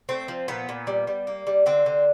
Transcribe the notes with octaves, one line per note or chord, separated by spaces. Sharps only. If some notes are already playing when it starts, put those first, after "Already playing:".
A3 C4
F3
A#2 B3
A#2
G3
G3
A#3
G3
D3 C4
D3